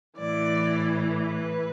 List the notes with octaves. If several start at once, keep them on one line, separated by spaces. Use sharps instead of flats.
A2 E3 D5
B4